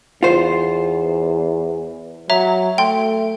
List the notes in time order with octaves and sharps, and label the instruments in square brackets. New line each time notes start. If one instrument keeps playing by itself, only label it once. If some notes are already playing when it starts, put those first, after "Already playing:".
[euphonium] E2 [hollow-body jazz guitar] F4 C5
[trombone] F#3 [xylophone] C#5 E5 A#5
[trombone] A3 [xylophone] G5 C6